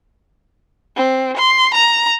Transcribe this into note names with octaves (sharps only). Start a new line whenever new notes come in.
C4
C6
A#5